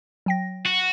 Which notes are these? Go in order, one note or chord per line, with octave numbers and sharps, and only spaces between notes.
F#3 G5 A#6
F#4